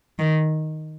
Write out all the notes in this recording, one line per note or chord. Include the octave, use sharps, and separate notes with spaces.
D#3